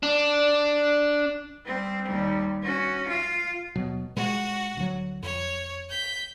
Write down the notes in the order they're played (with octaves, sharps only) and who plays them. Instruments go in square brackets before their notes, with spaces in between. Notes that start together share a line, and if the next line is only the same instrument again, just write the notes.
[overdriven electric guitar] D4
[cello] G3 C4
D#2 G3
C#4 F#4
F4 F5
[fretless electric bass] D#2 B2 F#3
[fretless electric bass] A#2 G#3 [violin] F#4
[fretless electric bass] D2 F#3
[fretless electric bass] F2 [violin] C#5
[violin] G6 B6